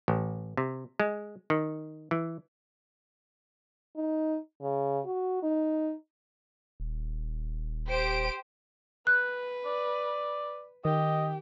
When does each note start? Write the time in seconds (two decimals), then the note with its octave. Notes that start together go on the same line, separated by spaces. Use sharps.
0.08 A1
0.57 C3
1.00 G#3
1.50 D#3
2.11 E3
3.96 D#4
4.62 C#3
5.05 F#4
5.43 D#4
6.80 D#1
7.89 G4 C5 D7
9.07 B4 F#6
9.66 D5
10.85 D#3 G4 D#5